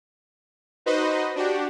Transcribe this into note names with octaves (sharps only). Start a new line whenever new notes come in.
D#4 F#4 B4 C5 D#5
D4 F#4 G4